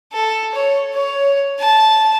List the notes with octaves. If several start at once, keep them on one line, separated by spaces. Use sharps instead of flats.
A4
C#5
C#5
A5